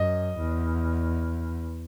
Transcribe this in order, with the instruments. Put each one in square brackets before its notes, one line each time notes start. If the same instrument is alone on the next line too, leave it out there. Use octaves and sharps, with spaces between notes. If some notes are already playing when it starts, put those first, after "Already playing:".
Already playing: [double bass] F#2 [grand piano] D#5
[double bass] E2